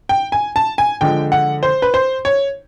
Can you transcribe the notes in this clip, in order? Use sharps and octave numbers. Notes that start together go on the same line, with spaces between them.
G5
G#5
A5
G#5
D3 F3 G#3 G5
F#5
C5
B4
C5
C#5